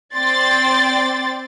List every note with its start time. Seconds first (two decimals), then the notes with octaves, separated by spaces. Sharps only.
0.16 C4 D5 G5 C6 A6